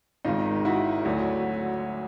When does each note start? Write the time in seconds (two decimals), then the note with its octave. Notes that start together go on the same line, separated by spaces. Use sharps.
0.25 G#1 G#2 D#3 D#4 F4
0.65 E4 F#4
1.05 D2 D3 F#3